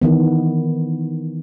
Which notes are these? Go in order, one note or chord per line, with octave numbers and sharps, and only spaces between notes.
D#3 E3 B3